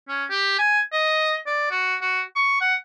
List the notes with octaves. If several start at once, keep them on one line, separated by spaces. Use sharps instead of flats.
C#4
G4
G#5
D#5
D5
F#4
F#4
C#6
F#5